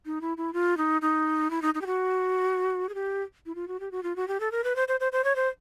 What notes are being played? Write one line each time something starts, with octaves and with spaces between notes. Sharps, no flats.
D#4
E4
E4
F4
D#4
D#4
E4
D#4
D#4
G4
F#4
G#4
G4
E4
F4
F#4
G4
F#4
F4
F#4
G4
A4
A#4
B4
C5
C5
C5
C5
C#5
C5